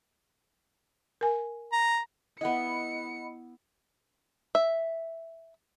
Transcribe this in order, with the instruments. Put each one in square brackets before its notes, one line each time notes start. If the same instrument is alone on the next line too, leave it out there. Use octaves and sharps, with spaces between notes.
[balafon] A#4 G#5
[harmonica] A#5
[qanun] B3 E4 [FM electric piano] D#5 F#5 B5 [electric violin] C#7
[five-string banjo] E5